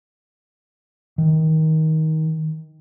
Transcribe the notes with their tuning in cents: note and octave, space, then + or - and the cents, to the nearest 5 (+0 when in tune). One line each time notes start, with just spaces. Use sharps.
D#3 +20